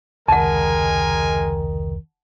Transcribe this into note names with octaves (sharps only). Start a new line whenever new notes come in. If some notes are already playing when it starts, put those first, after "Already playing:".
F1 C#2 D#3 G#3 A#4 F#5 G#5 A5